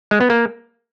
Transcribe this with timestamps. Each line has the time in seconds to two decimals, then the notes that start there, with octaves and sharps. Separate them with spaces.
0.11 G#3
0.20 B3
0.30 A#3